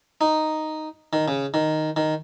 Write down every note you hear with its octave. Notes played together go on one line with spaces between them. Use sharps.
D#4
D#3
C#3
D#3
D#3